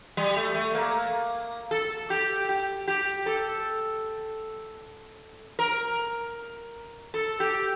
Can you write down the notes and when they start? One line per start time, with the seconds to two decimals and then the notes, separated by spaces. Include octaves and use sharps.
0.17 G3
0.36 A3
0.55 A3
0.75 A#3
1.71 A4
2.10 G4
2.49 G4
2.87 G4
3.26 A4
5.59 A#4
7.14 A4
7.40 G4